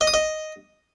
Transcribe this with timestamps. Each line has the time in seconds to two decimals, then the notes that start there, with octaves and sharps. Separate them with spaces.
0.01 D#5
0.07 D#6
0.14 D#5